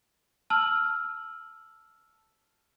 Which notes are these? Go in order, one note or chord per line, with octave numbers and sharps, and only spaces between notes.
A5 E6 F6 F#7